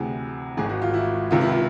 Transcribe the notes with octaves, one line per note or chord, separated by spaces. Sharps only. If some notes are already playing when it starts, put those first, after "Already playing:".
Already playing: D2 C3 E3 G#4
G#1 G#2 D#3 G#4
F#4
F4
E4
C#2 C3 D#3 F4
E4
F4